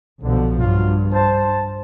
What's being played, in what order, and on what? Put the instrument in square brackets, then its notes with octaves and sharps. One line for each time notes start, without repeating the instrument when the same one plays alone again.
[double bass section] B1 B2 F3 [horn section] D3
[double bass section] G2 [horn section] F#3 F4
[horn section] C5 A5